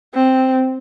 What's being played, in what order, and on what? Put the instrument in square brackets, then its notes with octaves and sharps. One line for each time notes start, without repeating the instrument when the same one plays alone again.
[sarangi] C4